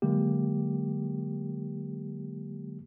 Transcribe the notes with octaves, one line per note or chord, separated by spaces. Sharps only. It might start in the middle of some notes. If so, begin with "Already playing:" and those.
D3 F#3 G#3 A#3 G4